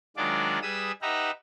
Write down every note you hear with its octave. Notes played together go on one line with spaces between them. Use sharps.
D#3 F#3 G#3 D4 F4 D5
G3 G#4 B4 D#6 E6
D#4 G4 B4 E5 F#5 A#5